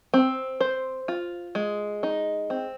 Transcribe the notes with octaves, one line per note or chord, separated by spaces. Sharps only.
C4
C5
F4
G#3
D#4
C4